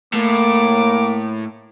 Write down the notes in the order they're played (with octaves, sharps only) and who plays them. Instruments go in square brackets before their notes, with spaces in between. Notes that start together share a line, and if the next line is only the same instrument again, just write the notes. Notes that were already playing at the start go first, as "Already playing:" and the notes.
[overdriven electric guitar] A2 [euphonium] A#3 [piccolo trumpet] D6